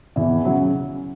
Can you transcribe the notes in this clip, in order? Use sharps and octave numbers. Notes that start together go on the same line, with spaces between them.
E2 B2 E3
C#3 F#3